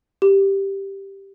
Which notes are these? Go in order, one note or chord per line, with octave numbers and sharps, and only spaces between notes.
G4